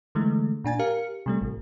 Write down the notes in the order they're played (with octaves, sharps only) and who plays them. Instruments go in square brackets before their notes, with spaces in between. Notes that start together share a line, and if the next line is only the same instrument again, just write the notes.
[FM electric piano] D3 E3 G#3 A3
A#2 D4 G#5 A6
G4 A#4 F5 C#7
C3 G3 A3
A1